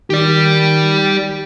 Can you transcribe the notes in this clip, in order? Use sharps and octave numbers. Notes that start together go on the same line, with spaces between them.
D#3 G4 D5